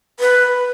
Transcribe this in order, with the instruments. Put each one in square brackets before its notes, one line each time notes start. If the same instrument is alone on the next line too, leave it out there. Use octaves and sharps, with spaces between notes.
[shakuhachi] B4